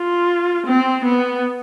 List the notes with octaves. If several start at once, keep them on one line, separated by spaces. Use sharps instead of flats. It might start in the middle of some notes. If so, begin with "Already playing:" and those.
Already playing: F4
C4
B3